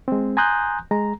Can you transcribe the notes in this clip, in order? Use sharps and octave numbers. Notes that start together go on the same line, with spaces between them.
G#3 C4
G#5 A#5 C6 D#6 F#6 G6
G#3 A#5